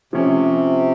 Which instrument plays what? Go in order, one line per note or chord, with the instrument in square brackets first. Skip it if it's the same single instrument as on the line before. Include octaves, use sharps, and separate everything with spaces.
[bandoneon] C3 [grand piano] F3 A3 C#4